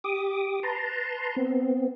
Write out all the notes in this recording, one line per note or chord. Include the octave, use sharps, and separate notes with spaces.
G4 D6 D#6
B4 A5 A#5 C6
B3 C4